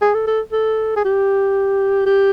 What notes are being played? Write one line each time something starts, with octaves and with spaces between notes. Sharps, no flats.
G#4
A4
A4
A4
G#4
G4
G4